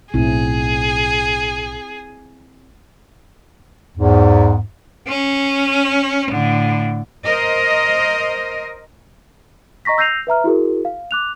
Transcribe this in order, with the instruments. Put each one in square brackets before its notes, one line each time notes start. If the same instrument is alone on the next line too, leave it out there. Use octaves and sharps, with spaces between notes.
[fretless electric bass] B1 A2 [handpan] C4 E4 [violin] G#4
[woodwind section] E2 G#2
[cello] C#4
A2 D3
[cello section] A#4 C5 D#5
[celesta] D#5 A#5 C#6 A#6 B6
E6 G6 A#6 C7 D#7 F7
B4 E5 A#5 F6
E4 F#4 G#4 A#4
F5
D6 F#6 F7